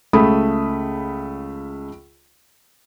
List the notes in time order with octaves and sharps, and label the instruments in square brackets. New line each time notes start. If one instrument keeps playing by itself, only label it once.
[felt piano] C#2 C#3 A3 B5 D#6